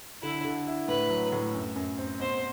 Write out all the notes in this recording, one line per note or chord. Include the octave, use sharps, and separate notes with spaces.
D3 E4
D3
E4
A2 B4
F#3
A2
F#2
F#2
C4
B2 C5